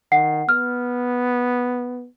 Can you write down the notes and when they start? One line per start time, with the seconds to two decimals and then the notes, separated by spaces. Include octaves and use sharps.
0.12 D#3 F#5 C7
0.49 B3 F6